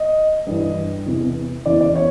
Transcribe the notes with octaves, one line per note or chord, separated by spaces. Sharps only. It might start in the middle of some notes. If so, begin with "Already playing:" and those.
Already playing: D#5
G2 E3
E2 C3 E3
E2 C#3 E3 D5
D5
C#5